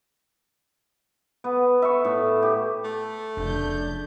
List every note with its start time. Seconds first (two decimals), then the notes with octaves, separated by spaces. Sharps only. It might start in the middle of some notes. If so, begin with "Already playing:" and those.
1.44 B3
1.82 E5 C#6
2.05 A2
2.42 G4
2.84 A3
3.37 F1 A#1 C#3 D4 G6